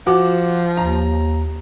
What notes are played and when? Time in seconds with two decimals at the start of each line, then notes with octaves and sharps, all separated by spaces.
0.07 F3 F#4 D6
0.77 D#2 A#5